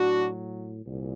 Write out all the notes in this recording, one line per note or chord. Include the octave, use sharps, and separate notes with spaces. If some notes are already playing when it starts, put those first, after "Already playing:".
Already playing: A2 F#3 D4 F#4
C2 A#2